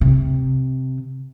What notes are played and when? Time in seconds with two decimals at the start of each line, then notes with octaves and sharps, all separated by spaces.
0.01 C3